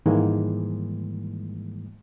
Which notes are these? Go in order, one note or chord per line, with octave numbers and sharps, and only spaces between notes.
G#2 D#3 E3 G3 G#3 A#3